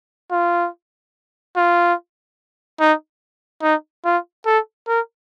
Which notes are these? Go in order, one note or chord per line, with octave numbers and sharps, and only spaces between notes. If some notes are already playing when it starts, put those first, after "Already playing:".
F4
F4
D#4
D#4
F4
A4
A#4